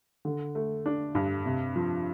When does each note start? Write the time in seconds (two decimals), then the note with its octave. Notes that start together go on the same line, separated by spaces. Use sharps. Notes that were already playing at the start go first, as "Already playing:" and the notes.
0.25 D3
0.55 A3
0.86 D4
1.15 G2
1.46 C3
1.76 F3